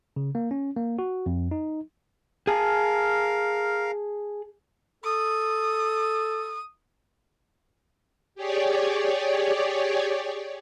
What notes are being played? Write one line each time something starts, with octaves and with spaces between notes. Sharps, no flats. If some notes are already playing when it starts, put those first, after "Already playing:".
C#3
A#3
C#4
A#3
F#4
F2
D#4
G#4 A#4 F5 A5
A4 D#6
G4 G#4 C#5 D5